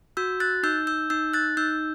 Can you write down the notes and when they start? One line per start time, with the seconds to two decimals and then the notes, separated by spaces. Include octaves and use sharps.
0.17 F#4 E6 G6
0.40 F#6 A6
0.63 D#4 E6 G6
0.87 E6 G6
1.10 D#4 E6 G6
1.33 F#6 A6
1.57 D#4 E6 G6